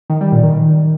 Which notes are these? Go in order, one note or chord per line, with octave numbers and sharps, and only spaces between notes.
D#3
G3
A#2
D#3